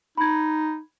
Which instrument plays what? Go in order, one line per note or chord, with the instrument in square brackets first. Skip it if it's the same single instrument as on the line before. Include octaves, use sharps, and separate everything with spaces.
[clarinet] D#4 [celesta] B5 G#6